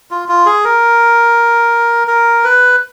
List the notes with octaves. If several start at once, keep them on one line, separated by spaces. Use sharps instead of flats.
F4
F4
G#4
A#4
A#4
B4